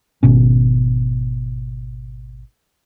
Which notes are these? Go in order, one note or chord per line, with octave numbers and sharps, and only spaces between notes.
G#1 B2 C#4